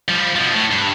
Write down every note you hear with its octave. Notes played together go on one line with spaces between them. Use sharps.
F3 G3
B2 F3
A2
G2